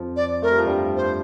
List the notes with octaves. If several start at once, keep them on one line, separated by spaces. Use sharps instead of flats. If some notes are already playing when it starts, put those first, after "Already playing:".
Already playing: F2 F3
D5
A3 A#4
G3
F3
G2 G3
C5